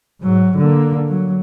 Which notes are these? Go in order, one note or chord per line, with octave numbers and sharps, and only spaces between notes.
G#2 F#3
D3 A#3
F#3